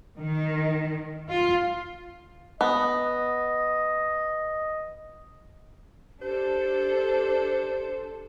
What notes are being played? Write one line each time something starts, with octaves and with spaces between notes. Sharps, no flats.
D#3
F4
B3 D#5
D4 G4 A4 C5